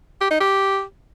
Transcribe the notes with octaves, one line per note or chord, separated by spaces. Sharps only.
G4
D#4
G4